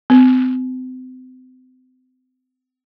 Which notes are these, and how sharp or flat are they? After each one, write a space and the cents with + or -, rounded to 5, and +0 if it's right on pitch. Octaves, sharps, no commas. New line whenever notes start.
C4 -40